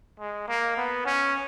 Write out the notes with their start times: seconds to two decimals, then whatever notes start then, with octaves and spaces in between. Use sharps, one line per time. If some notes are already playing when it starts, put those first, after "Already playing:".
0.19 G#3
0.48 A#3
0.77 B3
1.05 C#4